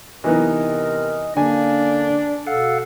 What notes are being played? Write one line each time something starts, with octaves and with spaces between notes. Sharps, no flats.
C3 E3 B3 C4 D#4 A#4 D#5
D3 A#3 C#4 D4 G#5
B2 A4 F5 F#5